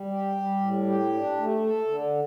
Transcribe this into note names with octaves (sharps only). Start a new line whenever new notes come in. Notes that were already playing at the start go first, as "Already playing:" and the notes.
Already playing: G3
G4
G3
A2
G4
D4
A3
A4
D3